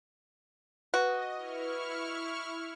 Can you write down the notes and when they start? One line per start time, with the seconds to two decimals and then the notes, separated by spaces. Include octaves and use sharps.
0.94 F#4 B4 D#5
1.34 E4 C#6 F6